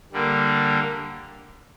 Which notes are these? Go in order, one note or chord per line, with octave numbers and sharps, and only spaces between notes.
D3 G3 A#3